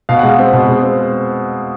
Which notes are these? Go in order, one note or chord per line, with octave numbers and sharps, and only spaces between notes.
B2 F5
G#3 F#5
F5
C4
B2
G#3
C4